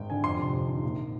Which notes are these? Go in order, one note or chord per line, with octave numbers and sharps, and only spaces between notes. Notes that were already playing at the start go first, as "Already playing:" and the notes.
Already playing: G#1 G#3 G5
D3 G#5
F2 C6
C3
F2
D#3
A#1